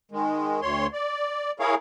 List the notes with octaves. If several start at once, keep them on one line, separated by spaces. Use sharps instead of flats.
D#3 G#3
D2 C#5 C6
D5
E4 G#4 A#4 C#5 F5